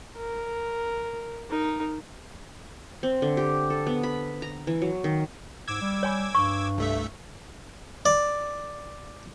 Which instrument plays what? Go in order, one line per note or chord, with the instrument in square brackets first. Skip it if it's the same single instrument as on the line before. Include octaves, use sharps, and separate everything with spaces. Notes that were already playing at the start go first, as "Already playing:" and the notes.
[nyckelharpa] A#4
D#4 A#4
[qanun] C4
D3
G4
A4
B3
B5
A#5
E3
F#3
D#3
[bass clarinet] G#2 [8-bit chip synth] D6 E6 G#6
[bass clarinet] G3
[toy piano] C#5 G#5 B5
[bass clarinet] G2 [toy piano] C#6
[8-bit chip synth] C2 A3 E5
[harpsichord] D5